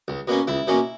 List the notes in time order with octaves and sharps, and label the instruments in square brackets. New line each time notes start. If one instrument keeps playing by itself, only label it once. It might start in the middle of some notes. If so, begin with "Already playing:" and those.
[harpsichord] C#2
B2 A#3 C#4
C#2 E4
B2 A#3 C#4